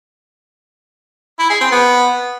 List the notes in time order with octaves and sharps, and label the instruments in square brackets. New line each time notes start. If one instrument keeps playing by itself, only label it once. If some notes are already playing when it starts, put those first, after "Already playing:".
[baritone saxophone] E4
G#4
C4
B3